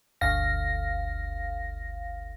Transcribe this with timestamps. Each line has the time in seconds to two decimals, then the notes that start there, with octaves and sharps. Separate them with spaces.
0.21 G1 D2 F5 A#6